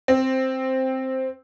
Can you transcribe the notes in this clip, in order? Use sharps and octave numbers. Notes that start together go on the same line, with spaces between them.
C4